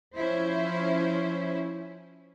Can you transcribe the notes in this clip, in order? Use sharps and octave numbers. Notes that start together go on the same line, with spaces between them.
F3 C#4 E4 C5